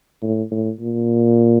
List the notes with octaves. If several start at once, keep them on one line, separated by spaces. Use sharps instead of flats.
A2
A2
A#2